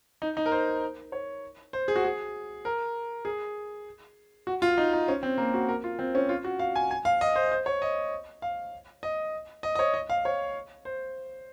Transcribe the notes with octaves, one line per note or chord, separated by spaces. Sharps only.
D#4
D#4
A#4
C5
C#5
C5
G#4
F#4
G#4
A#4
G#4
F#4
F4
D#4
D#4
C#4
C4
A#3
F#4
A#4
F4
C4
C#4
F4
F#4
F5
G#5
G#5
F5
D#5
C5
C5
C#5
D#5
F5
D#5
D#5
D#5
C#5
D#5
F5
C#5
C5